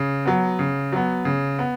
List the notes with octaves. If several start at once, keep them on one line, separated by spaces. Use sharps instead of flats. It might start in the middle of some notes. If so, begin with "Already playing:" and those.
Already playing: C#3
F#3 B3
C#3
F#3 B3
C#3
B3